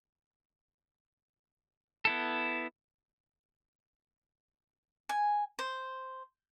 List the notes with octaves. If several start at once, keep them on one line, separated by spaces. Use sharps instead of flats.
B3 E4 A4
G#5
C5